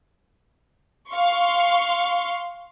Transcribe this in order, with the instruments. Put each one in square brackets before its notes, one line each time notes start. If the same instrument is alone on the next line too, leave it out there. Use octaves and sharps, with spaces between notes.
[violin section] F5 C6 C#6